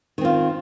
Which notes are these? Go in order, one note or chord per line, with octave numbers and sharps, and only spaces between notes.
D#3 C4 F4